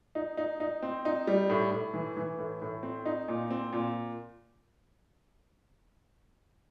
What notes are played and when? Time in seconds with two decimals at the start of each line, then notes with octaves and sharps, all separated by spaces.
0.15 D#4
0.37 D#4
0.60 D#4
0.82 C4
1.05 D#4
1.27 G3
1.50 A2
1.71 A2
1.94 E3
2.17 E3
2.39 A2
2.62 A2
2.83 C4
3.06 D#4
3.28 A#2
3.50 C4
3.73 A#2